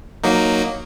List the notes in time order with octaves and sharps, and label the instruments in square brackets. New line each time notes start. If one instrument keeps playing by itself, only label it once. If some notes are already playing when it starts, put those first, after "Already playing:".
[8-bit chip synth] F#3 A#3 D#4